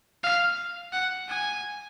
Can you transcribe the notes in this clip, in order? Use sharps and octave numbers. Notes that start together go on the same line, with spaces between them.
F5
F#5
G#5